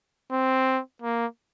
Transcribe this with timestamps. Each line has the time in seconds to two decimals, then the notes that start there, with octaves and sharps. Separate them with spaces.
0.32 C4
1.02 A#3